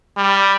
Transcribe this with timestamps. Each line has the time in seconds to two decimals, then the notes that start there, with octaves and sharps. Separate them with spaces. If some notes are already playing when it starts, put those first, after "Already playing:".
0.17 G3